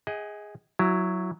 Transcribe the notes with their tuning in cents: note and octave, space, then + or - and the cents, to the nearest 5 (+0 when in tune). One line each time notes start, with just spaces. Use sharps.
G#4 -5 D#5 +30 F#5 +40
F#3 +0 E4 +10